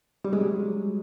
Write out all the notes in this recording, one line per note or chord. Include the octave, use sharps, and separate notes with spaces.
G3
G#3
F#3